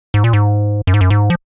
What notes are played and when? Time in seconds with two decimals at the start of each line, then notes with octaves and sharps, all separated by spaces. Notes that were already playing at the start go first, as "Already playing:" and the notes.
0.14 G#2
0.24 A#2
0.33 G#2
0.87 F#2
0.94 G#2
1.01 F#2
1.10 G#2
1.30 F3